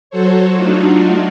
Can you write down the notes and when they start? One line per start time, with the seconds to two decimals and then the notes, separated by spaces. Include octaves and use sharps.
0.10 F#3 F#4 A4 C5 C#5
0.54 F#3 A3 D4 D#4 F4 F#4